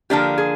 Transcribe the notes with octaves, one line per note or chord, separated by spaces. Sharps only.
D3 F3 A#3 D4 G4
G#4